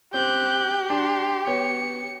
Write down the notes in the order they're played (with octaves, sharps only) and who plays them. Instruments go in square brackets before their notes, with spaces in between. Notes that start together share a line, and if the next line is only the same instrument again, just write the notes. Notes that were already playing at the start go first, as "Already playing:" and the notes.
[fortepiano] C4 [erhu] G4 [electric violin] F#6 G6
[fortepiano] D4 [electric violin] C6
[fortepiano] B3 C#5 [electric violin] C#7